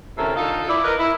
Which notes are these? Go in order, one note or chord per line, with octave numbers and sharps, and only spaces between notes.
D2 A2 C3 C#4 A4 A#4
D3 D#4 F4 A4
E4 D5
A#4 B4 D#5
E4